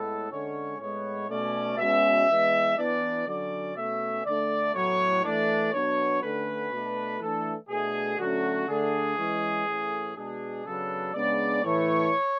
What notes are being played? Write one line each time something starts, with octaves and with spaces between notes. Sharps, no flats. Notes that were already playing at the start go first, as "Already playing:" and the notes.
Already playing: A2 G#3 B3 A4
D3 G#3 C#4 C#5
A2 G#3 B3 C#5
B2 A3 C#4 D5
B2 G#3 C#4 E5
E3 G#3 B3
E3 B3 D4 D5
D3 F#3 C#4 D5
B2 A3 C#4 E5
D3 A3 D4 D5
A2 F#3 B3 C#5
E3 A3 D4 D5
B2 F#3 B3 D4 C#5
D3 A3 C#4 B4
B2 A3 D4
E3 A3 D4 A4
B2 A3 D4 G#4
D3 F#3 A3 C#4 F#4
D3 A3 D4 G#4
E3 G#3 C#4
A2 E3 A3 C#4
B2 G#3 D4 G#4
C#3 F#3 B3 D4 A4
C#3 G#3 B3 D4 D5
A2 E3 A3 C#5